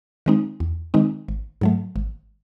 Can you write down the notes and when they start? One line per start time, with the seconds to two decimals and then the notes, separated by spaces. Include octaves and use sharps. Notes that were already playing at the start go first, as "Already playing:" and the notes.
0.26 D#3 G#3 C4 D#4
0.60 E2
0.94 D#3 G#3 C4 D#4
1.28 G#1
1.61 G#2 F#3 A3
1.96 G#1